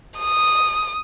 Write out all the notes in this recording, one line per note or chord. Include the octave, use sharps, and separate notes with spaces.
D#6